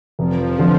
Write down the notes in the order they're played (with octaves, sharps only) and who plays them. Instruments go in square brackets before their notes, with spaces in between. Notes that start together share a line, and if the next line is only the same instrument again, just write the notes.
[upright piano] F1 [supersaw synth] F3
[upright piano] D3 F3